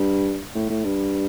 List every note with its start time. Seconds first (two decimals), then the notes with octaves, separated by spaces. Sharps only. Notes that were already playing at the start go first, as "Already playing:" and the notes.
Already playing: G2
0.55 A2
0.70 A2
0.85 G2